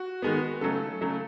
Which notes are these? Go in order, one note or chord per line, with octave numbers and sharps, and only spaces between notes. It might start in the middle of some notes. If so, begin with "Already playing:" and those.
Already playing: F#4
D#3 G#3 B3
C#3 F#3 A3 A4
C#3 F#3 A3